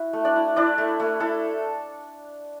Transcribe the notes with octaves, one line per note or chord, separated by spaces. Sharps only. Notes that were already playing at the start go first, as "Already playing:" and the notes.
Already playing: E4 F#4
A3
D4 D5
E4
D4 E4 D5
A3
A3
E4 A4